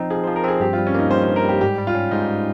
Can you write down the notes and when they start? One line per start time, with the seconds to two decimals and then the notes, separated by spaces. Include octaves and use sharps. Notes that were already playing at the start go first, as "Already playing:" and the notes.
Already playing: F3 C4 D#4
0.10 F3 G#4
0.24 C5
0.27 F3
0.36 A#4
0.44 C4 G#4
0.60 G2 G4
0.73 F4
0.78 G3
0.87 C#4
0.94 A#3 D#4
1.11 G2 C5
1.23 C5
1.28 G2
1.36 A#4
1.45 G3 G4
1.61 G#2 G4
1.78 G3
1.87 F4
1.95 C#4
2.11 G#2 D#4